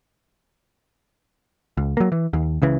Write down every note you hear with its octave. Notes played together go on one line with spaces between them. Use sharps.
C#2
F#3 A#3
E3
D#2
C#2 C#3 E3